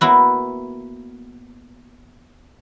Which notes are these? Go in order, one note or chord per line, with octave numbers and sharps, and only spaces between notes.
A#3 B3 E4 F#4